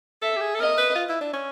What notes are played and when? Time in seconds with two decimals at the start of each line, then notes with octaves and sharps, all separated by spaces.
0.22 A4 E5
0.37 G4
0.41 G#4
0.55 A4
0.59 A#4 D#5
0.78 B4
0.96 F4
1.09 E4
1.21 D4
1.34 C#4